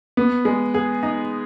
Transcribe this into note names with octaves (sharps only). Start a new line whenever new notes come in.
B3
G#3
G#4
D#4